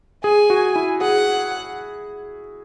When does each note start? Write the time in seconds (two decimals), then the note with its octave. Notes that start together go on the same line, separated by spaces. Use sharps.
0.24 G#4 G#5
0.50 F#4
0.76 E4
1.01 G#4 F#5